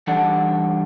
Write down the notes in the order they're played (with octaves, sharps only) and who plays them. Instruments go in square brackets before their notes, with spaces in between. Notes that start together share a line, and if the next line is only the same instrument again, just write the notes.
[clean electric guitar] E3 G3 D4 A4 F#5